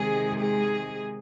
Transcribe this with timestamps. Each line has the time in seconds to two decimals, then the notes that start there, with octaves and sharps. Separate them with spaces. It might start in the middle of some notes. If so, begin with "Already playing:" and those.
Already playing: C3 D#3 G#3 G#4
0.39 G#4